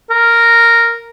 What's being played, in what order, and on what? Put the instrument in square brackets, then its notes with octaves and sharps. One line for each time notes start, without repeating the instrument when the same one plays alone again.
[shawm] A#4